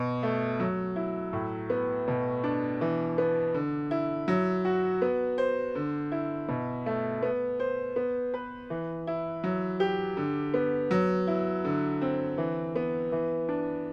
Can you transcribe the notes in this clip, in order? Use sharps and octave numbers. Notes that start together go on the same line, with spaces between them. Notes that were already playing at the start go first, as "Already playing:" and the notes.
Already playing: B2
A3
F#3
E4
A2
B3
B2
D4
E3
B3
D3
E4
F#3
F#4
B3
C5
D3
E4
B2
A3
B3
C5
B3
B4
E3
E4
F#3
G4
D3
B3
F#3
E4
D3
C4
E3
B3
E3
D4